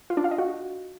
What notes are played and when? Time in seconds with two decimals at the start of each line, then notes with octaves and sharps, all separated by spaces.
0.10 F4
0.17 D4
0.24 F5
0.31 D#5
0.38 F#4